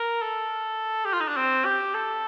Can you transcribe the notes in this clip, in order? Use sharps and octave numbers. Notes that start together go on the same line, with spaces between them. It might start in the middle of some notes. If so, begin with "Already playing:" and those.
Already playing: A#4
A4
G4
F4
D#4
D4
C4
G4
A4